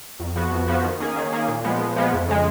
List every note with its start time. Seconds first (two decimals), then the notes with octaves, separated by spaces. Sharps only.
0.20 F2
0.36 F3 B3 F#4
0.52 F2
0.68 F3 B3 F#4
0.84 D#3
1.00 A#3 C#4 G#4
1.16 D#3
1.33 A#3 C#4 G#4
1.48 A#2
1.64 F3 G#3 B3
1.81 A#2
1.96 F3 G#3 B3
2.13 F2
2.28 C#3 G#3